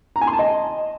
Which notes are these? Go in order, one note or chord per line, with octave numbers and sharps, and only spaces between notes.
A#5
G#5
C6
A5
D#5